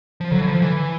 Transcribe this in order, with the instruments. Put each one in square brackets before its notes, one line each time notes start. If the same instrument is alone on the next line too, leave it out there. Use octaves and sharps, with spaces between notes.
[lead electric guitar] F3
[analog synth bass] D3 [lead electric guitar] F#3
[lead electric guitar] E3
F3
E3